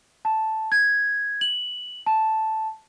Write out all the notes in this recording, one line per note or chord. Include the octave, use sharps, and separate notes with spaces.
A5
G#6
F#7
A5